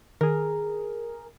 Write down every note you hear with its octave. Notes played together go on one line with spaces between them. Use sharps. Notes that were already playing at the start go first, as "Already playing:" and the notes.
D#3 G#4 A#4